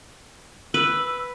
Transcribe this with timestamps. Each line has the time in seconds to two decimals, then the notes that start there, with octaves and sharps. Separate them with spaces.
0.74 B4 E6